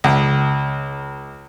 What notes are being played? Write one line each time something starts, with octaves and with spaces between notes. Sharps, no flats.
C#2